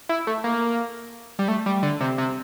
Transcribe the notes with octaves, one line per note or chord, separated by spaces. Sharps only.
E4
A3
A#3
G3
A3
G3
D3
C3
C3